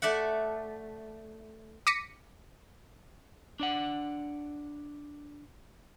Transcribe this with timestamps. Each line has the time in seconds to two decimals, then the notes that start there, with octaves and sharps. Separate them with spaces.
0.02 A3 D5 E5 F#5
1.87 D6 A#6 B6 C#7 D#7
3.60 D4 D5 F#5